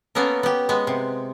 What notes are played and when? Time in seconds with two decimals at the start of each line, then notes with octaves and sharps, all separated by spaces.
0.15 A#3 B3 C#4 A4 A#4
0.43 B3 G4
0.69 G#3 B3
0.87 C3